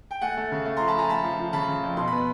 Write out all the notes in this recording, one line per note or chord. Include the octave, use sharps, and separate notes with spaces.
G5
A3 F#5 G#5
A3
C#3
A3
F3 A#5 C6
A5 B5
F3 G#5 A#5
A3 A5 B5
F3
F3
C#3 A5 B5
C#3
F2
B2 C6
B3 B5